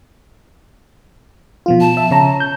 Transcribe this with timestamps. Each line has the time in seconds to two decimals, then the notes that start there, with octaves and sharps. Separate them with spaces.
1.66 B2 F3 F4
1.80 A5
1.97 E5
2.11 C#3 C#5 A#5
2.40 G6